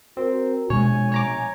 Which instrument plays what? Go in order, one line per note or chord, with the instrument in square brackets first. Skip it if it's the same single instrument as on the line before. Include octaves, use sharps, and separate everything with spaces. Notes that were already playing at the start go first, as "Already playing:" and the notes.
[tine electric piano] C4 [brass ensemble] F#4 A#4
[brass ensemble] A#1 G#5 [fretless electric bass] B2 G#3 [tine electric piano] C#5
[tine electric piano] C#5 A#5 D6